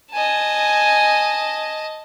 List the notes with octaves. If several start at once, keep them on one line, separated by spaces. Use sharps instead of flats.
D#5 G#5 A5